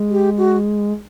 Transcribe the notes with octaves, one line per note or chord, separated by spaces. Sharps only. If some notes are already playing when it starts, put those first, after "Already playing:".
Already playing: G#3
G4
F#4